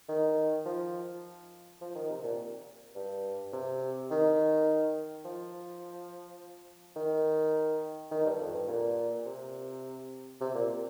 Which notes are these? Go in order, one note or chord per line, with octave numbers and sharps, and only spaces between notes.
D#3
F3
F3
D#3
C3
A#2
G2
C3
D#3
F3
D#3
D#3
G2
F2
G2
A#2
C3
C3
A#2